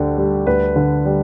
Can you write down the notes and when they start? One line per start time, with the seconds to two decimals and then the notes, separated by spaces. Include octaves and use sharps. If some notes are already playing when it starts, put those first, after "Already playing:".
Already playing: D2 D3 G4
0.17 G3
0.47 D2 B4
0.76 D3
1.05 G3